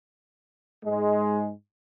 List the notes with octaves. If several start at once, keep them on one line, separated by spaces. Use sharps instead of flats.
G#2 G#3